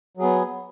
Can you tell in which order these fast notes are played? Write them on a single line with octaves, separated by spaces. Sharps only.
F#3 G#4 B3